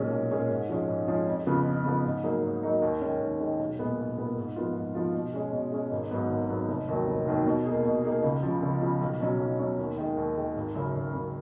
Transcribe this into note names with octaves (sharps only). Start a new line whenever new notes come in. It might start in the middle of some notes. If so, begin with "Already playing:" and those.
Already playing: B1 A#2 G#3 C#4 G#4
B1
A#2 G#3 C#4 G#4
G#2
F3 G#3 C#4 G#4
G#2
F3 G#3 C#4 G#4
F2
C#3 F3 B3
F2
C#3 F3 B3
G#2
F#3 A#3 D#4 G#4
G#2
F#3 A#3 D#4 G#4
D#2
D#3 G#3 C#4
D#2
D#3 G#3 C#4
B1
A#2 G#3 B3
B1
A#2 G#3 B3
G#2
F3 B3 F4
G#2
F3 B3 F4
B2
G#3 C#4 G#4
B2
G#3 C#4 G#4
G#1
G#2 F#3 B3
G#1
G#2 F#3 B3
F1
D#2 D#3 F#3
F1
D#2 D#3 F#3
B2
A#3 D#4 G#4
B2
A#3 D#4 G#4
C#2
C#3 F3
C#2
C#3 F3
B1
B2 F#3 C#4
B1
B2 F#3 C#4
D#2
D#3 G#3
D#2
D#3 G#3
G#1
F#2 C#3
G#1
F#2 C#3